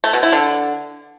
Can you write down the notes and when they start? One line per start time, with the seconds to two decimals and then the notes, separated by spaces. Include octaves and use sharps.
0.04 A3
0.13 B2
0.23 E4
0.32 D3